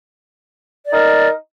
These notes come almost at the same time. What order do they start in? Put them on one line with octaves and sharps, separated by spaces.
D5 D#4 A#4